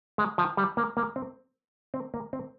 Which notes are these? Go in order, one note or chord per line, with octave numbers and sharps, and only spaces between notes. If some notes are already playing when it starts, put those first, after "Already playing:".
G#3
F3
G3
A#3
A#3
C4
C4
A#3
C4